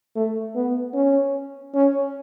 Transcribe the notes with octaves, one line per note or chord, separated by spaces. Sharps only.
A3
B3
C#4
C#4